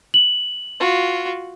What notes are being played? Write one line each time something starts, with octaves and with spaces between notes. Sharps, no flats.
F#7
F4 F#4